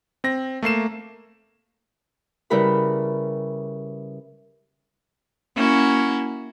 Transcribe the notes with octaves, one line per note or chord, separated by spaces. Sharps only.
C4 A#6
A3 A#3 C7 E7
C#3 G3 E4 A#4 B4 B5
A#3 C#4 E4 F#4